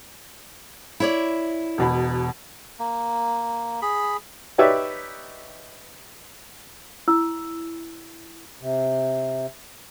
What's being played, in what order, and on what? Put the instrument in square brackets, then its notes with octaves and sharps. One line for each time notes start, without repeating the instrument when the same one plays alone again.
[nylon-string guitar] E4 C#5 D5
[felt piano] E1 B2 B5
[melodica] A#3
G#4 B5
[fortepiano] D#4 G4 B4 C#5 D5 E5
[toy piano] E4 E6
[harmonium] C3